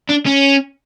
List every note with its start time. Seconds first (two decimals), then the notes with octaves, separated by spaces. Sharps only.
0.09 D4
0.26 C#4